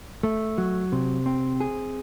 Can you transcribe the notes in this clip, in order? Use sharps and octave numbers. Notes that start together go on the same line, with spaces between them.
A3
F#3
C3
C4
G#4